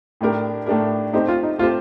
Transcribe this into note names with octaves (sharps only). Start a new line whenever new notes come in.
A2 A3 D4 G4 A#4
A2 A3 D4 G4 A#4
A3 C4 D#4 G4 C5
F4
D#4
A3 C4 F4 G4 C5